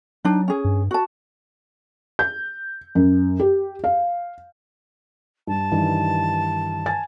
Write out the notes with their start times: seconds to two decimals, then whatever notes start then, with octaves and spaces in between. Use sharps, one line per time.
0.25 F#3 D4 D#4
0.48 C#4 G#4
0.65 G2
0.91 F#4 A5
2.19 G6
2.95 F#2
3.40 G4
3.84 F5
5.47 G2 A5
5.72 G2 D#3 E3
6.86 G#5 A6